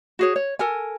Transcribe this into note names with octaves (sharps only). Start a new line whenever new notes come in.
F#4 G#4 C#5
C#5
A4 A#4 G#5